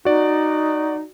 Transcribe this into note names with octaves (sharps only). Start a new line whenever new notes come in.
D#4 F#4 D5